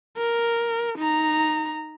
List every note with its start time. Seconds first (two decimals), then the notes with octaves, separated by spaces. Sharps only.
0.17 A#4
0.98 D#4 A#5